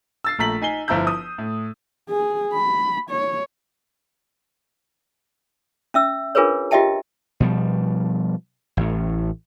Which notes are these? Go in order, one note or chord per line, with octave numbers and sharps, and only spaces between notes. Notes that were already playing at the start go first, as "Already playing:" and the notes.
E6 A6 C7
A#1 A3 A#5 B6 F#7
D#4 G#5 C7 G7
G1 F3 E4 A#5 E6 G6
D#6
A2
G#4
B5
C#5
C#4 E5 E6
D4 F4 G#4 A#4 B4 C#5
F4 G4 D#5 E5 G5 A5
B2 F3 G3
A1 A2